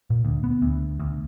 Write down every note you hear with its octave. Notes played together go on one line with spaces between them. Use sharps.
A#2
D2
B3
D2
D2